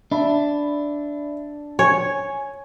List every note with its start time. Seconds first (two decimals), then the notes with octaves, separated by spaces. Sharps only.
0.12 D4 E5 B5
1.79 C#5 G#5